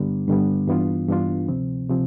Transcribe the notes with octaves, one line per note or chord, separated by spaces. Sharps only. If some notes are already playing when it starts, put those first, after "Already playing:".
Already playing: G2 D3 G3 B3
G2 D3 G3 B3
G2 E3 B3 D4 F4
G2 E3 B3 D4 F4
D2 C3 F3 C4
C3 F3 C4